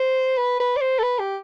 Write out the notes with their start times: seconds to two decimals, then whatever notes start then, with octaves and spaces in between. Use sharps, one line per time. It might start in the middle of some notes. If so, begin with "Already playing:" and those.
Already playing: C5
0.37 B4
0.60 B4
0.77 D5
0.81 C5
0.99 A4
1.03 B4
1.19 G4